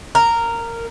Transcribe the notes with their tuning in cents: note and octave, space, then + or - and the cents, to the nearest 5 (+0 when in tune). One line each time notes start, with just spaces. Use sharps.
A#4 -10